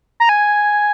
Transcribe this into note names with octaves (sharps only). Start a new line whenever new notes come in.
A#5
G#5